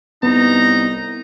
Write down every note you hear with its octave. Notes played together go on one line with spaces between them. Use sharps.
C2 B3 D#4 A#5